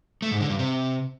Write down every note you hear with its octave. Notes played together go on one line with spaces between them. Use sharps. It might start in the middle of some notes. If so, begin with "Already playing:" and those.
A3
G#2
D3
G2
C3